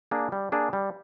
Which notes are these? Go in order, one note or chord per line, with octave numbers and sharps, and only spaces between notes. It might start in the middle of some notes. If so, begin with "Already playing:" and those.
A#3 D4 G#4
G3
A#3 D4 G#4
G3